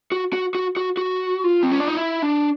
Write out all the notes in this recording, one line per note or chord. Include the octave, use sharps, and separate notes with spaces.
F#4
F#4
F#4
F#4
F#4
F4
C4
C#4
D4
D#4
E4
D4